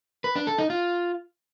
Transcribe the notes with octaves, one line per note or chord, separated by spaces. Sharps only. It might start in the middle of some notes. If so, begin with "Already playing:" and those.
B4
D4
A4
D#4
F4